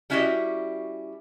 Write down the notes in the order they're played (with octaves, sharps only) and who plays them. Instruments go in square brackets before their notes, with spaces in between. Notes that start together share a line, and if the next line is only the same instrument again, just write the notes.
[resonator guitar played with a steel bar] G3 C#4 E4 F#4 G4 D#5